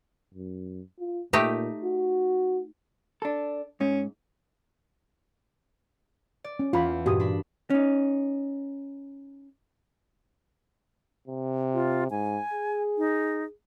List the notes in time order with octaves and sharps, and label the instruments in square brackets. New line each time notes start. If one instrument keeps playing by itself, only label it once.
[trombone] F#2
F4
[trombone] A#2 [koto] A3 D#4 G4
[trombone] F#4
[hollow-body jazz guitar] D4 A4
[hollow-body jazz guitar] G#2 [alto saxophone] C#4
[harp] D5
[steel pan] C#4
[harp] E2 [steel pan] F4 B5
[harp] G2 A#2 [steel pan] F#4 G4 D#6
[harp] D4 B5
[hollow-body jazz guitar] C#4 D#4
[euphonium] C3
[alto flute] F4
[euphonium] G#2 [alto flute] G#5
[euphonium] G#4
[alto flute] D#4